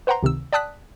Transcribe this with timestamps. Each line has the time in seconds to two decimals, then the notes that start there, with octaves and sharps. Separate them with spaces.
0.07 B4 C5 F#5 G5 A#5 C6
0.23 C#2 C3 D#3 E6
0.53 D5 G5 A5 D#6 F#6 B6